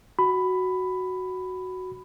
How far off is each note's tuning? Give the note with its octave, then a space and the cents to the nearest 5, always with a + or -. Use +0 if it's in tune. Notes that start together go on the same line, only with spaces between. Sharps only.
F#4 +0 B5 +10